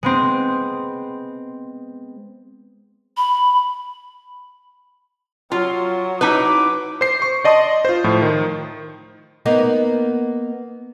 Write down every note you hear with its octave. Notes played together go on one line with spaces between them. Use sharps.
G#3 B3 C4
B5
F#3 F4
D#4 E4 B4 D6
C5 C7
C#6
D5 D#5 A5 C6 D#6
F4 C5
A2 F3
D#3
A#3 B3 D#4